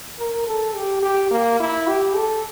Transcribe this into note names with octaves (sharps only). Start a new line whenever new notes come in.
A#4
A4
G4
G4
A#3
E4
G4
A4